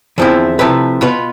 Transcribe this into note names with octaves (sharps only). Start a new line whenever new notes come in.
E2 D3 F3 C4 E4
C3 F3 A3 E4 B4
B2 B3 F4 B4